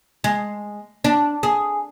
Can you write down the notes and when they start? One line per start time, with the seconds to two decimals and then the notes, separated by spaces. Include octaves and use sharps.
0.24 G#3
1.04 D4
1.43 G#4